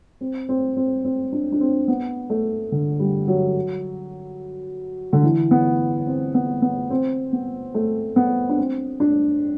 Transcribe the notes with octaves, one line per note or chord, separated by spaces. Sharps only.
C4
C4
C4
C4
D4
D4
C4
B3
A3
D3
G3
F#3
D3
E3
B3
C4
B3
B3
C4
B3
A3
B3
D4
C4
D4